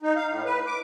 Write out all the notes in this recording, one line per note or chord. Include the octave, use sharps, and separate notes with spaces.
D#4
F5
A2
B4
D6